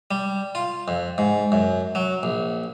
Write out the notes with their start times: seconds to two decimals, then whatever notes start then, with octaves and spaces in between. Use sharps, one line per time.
0.11 G3
0.55 F4
0.88 F2
1.18 G#2
1.52 F#2
1.95 F#3
2.23 A#1